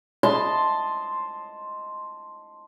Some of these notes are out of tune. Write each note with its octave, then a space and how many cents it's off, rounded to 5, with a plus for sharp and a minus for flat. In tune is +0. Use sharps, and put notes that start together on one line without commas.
D#5 +0 A5 +0 C6 +0